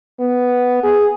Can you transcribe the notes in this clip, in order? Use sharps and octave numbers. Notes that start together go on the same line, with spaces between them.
B3
G#4